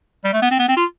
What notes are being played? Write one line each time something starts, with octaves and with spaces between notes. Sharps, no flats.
G3
A3
B3
C4
B3
C4
F4